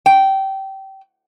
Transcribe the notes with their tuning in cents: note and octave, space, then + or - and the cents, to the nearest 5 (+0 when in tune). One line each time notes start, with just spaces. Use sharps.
G5 -20